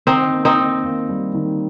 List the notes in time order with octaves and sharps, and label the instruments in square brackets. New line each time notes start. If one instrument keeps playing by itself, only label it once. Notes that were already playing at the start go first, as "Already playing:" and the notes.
[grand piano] D#3 [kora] C4 D#4
[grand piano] A#3
[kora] C4 D#4
[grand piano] D#3
A#3
G3
D#3